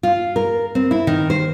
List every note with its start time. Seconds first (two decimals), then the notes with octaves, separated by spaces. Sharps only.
0.03 F4
0.36 A#4
0.75 C4
0.91 E4
1.07 D#3
1.30 C5